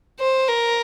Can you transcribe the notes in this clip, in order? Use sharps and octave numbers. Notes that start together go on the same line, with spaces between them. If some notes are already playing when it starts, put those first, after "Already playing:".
C5
A#4